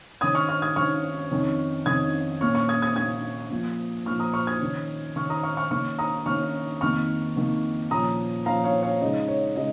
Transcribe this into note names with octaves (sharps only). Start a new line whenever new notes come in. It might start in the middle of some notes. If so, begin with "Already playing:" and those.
D#3 C#4 D#6 G#6
C#6 F6
C#6 F6
D#6 G#6
D#3 C#4 C#6 F6
F2 D#3 C#4
F2 D#3 C#4 D#6 G#6
A#2 A#3 C#4 C#6 F6
C#6 F6
D#6 G#6
D#6 G#6
A#2 A#3 C#4 D#6 G#6
A#2 F3 A#3
A#2 F3 A#3 C#6 F6
A#5 D#6
C#6 F6
D#6 G#6
D#3 C#4
D#3 C#4 C#6 F6
A#5 D#6
C#6 F6
C#6 F6
D#3 A#3 C#4 C#6 F6
A#5 D#6
D#3 A#3 C#4 C#6 F6
F2 D#3 A#3 C#6 F6
F2 D#3 A#3
A#2 F3 C#4 A#5 D#6
A#2 F3 C#4 F5 A#5
C#5 F5
C#5 F5
C#3 G#3 D#4 D#5
C#5
C#3 G#3 D#4 D#5